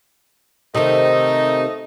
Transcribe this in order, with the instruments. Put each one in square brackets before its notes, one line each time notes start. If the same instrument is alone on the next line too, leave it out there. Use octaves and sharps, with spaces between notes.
[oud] C3 D#3 [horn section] A3 D#4 D#5